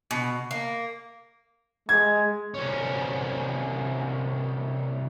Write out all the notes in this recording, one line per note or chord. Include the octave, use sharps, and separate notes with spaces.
B2
A#3
G#3 G#6
C2 C#4